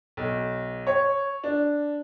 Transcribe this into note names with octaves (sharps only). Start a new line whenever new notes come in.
B1
C#5
D4